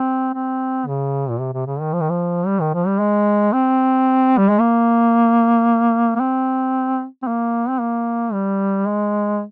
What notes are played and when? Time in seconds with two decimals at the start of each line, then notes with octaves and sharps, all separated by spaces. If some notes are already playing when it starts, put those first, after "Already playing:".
Already playing: C4
0.34 C4
0.87 C#3
1.30 A#2
1.40 C3
1.53 C3
1.67 C#3
1.81 D#3
1.93 F3
2.01 D#3
2.09 F3
2.46 G3
2.61 D#3
2.74 F3
2.87 G3
3.00 G#3
3.53 C4
4.38 G3
4.49 G#3
4.60 A#3
6.15 A#3
6.20 C4
7.22 C4
7.27 A#3
7.69 C4
7.80 A#3
8.33 G3
8.87 G#3